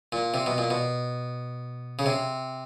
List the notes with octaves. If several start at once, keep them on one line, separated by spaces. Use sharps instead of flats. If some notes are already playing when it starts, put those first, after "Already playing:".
A#2
C3
B2
A#2
B2
C#3
C3